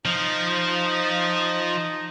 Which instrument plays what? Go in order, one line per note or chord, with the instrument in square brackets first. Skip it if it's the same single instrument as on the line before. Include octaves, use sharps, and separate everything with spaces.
[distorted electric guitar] F3 [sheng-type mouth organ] D#4 D#5